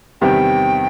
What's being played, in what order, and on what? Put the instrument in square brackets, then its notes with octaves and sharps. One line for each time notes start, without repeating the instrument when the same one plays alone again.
[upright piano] E2 C3 D#3 G3 [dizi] G5